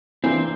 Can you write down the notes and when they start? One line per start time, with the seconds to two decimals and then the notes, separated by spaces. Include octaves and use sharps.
0.23 E3 A#3 C4 D4